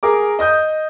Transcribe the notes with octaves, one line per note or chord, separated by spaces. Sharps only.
G#4 A#4 D6
D#5 D#6 G6